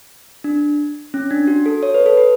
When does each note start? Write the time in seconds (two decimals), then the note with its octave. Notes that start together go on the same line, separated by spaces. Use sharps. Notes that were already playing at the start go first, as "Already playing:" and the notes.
0.44 D4
1.14 C#4
1.31 D4
1.47 F#4
1.66 A4
1.83 C#5
1.94 B4
2.06 A4
2.17 B4